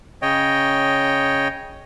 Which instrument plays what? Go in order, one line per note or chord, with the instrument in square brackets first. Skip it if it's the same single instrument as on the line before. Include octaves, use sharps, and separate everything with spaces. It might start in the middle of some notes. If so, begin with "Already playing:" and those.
[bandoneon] C#3 C#5 D#5 G5